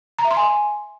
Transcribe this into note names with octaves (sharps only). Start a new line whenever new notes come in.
A#5
E5
C6
G#5